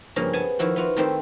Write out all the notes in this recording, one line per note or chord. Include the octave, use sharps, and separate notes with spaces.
G2 C#3 F3 A#3 C#4
B3 G#4 G#5 A5
D#3 F3 E4 F#4
B3 F4 F#4
D#3 A3 C4 E4 G4 C5